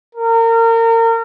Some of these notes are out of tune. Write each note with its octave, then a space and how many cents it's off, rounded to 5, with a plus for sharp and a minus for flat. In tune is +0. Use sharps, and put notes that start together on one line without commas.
A#4 -30